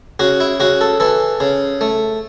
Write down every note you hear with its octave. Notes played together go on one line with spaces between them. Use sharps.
C#3 F#4
E4
C#3 F#4
A4
E3 A4
C#3
A3